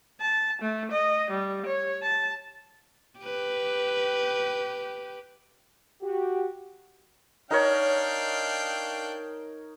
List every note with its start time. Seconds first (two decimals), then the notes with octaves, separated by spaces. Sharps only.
0.21 A5
0.62 A3
0.92 D#5
1.31 G3
1.67 C#5
2.03 A5
3.19 G4 B4
6.01 F#4 G4
7.51 D4 D#4 A#4 C#5 F5 G5